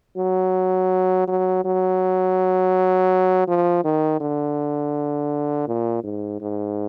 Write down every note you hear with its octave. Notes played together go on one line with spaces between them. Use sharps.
F#3
F#3
F#3
F3
D#3
D3
A#2
G#2
G#2